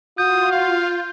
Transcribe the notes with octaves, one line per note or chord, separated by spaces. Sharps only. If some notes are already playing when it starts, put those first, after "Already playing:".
F4 F#4 D#6 G6
F5